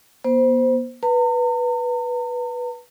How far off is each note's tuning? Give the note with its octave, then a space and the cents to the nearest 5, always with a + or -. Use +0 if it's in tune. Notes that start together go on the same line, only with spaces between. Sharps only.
B3 -40 C5 -10
B4 -10 A#5 -45